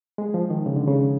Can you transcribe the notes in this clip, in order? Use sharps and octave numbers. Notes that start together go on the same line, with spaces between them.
G#3
F3
D#3
C#3
D3
C#3